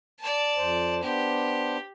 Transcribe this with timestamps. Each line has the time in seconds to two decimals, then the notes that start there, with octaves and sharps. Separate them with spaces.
0.19 D5 A5
0.57 F2 C5
1.03 B3 D4 G4 C5